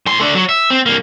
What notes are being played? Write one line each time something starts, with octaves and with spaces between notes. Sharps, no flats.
A2 C6
A3 D4
F#3
E5
C4
C2 A#3